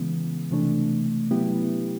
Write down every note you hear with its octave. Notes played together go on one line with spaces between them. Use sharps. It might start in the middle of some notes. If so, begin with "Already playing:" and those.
Already playing: C#3 E3 G#3 B3
C3 E3 A3 D4
F#3 B3 E4 G4